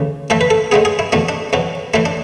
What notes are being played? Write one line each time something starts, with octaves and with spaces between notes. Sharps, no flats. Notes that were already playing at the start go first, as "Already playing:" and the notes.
Already playing: D2 C#3 E3
A2 E3 A3 A4
B4
A4
A2 G#3 B3 G#4
G#4
E4
E2 B2 A3 D4
D4
E2 B2 F#3
A2 E3 A3 E4
D4